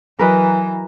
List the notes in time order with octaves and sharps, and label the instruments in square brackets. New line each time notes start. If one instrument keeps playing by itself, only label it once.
[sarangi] E3 [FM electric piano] F#3 A#5 [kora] A#4 B4 D#5